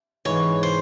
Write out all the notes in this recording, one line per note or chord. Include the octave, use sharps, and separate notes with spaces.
G#2 E3 G#3 C#5
C5